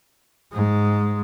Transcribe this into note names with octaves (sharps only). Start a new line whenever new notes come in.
G#2 G#3